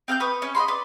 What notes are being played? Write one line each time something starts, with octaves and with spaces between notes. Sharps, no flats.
C4 F5 D#6 G6
B4 C#6 D#6
C#4
D#5 F#5 B5 C6
B4 D5